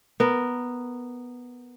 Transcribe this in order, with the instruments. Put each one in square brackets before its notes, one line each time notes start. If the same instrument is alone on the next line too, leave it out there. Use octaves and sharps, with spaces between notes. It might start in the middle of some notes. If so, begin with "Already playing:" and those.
[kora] B3 A#4